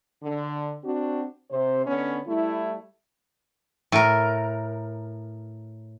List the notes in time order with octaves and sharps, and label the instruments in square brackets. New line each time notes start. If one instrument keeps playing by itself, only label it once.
[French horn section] D3
C4 D4 F#4
C3 C5
D3 B3 C#4
G3 A3 E4
[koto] A2 A#4